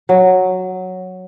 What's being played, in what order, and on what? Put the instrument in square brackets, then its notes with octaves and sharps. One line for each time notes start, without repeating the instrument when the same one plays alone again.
[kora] F#3